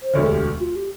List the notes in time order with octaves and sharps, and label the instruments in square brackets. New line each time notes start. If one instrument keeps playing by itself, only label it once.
[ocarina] C5
[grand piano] E1 D2 D3 [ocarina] C#5
[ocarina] G#4
G4
F#4
F4
G4